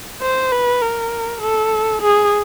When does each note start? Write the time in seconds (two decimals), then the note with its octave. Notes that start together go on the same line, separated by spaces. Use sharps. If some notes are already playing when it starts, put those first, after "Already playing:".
0.22 C5
0.52 B4
0.82 A#4
1.42 A4
2.02 G#4